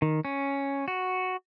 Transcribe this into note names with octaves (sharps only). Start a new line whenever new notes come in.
D#3
C#4
F#4